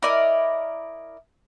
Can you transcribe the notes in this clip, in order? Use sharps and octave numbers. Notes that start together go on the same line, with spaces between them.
E4 A#4 D5 D#5